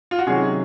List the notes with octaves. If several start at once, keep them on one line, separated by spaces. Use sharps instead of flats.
F4
F#4
C3 D#3 F#3 C#4 G#4